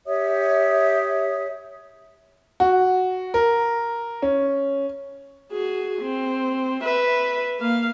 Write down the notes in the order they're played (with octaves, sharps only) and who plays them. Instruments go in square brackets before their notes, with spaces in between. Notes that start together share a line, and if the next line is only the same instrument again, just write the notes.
[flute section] G4 C#5 E5 D#6
[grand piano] F#4
A#4
C#4
[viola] F#4 G#4
C4
B4 E5
A#3 F5